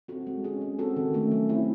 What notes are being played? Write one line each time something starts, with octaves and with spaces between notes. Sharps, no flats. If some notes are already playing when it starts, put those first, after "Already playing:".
C4 F#4 A4
G#3
C#4 G#4
G#3
C4 F#4 A4
D#3
A3 C#4
F#3
C4 E4